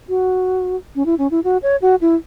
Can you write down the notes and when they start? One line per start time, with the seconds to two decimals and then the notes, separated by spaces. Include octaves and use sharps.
0.09 F#4
0.96 C#4
1.06 E4
1.18 C#4
1.31 E4
1.44 F#4
1.63 C#5
1.82 F#4
2.01 E4